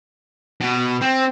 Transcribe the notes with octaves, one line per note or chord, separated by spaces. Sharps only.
B2
C4